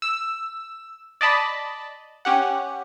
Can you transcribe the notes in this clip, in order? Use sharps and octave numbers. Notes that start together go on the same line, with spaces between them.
E6
D5 D#5 A5 B5
C#4 G4 F#5